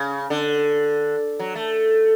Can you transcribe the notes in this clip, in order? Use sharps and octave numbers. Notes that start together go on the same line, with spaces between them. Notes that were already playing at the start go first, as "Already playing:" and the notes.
Already playing: C#3
D3
F#3
A3